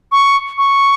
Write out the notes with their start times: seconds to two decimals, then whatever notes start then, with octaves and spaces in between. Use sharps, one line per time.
0.12 C#6
0.58 C#6